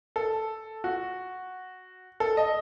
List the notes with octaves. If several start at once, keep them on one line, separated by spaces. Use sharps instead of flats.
A4
F#4
A4
D#5